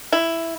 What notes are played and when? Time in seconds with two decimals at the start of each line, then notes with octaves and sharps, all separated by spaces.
0.12 E4